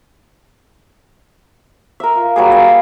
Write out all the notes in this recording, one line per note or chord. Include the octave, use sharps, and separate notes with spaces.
A#4 E5
F4
F#3 G3 A#3 G#4
E5 F5 G#5
D#5 B5